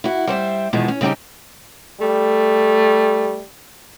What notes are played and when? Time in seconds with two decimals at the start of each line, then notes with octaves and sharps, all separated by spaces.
0.04 E4 F#4
0.27 G3 C5 C#5 E5
0.73 E2 B2 D#3 F3 G#3 D#4
0.88 C#4
1.01 C#3 G3 C4 D#4 G4
2.00 G3 A3